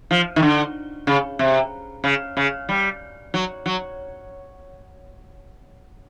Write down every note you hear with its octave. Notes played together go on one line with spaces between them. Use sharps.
F3
D#3
D3
C#3
C3
C#3
C#3
G3
F#3
F#3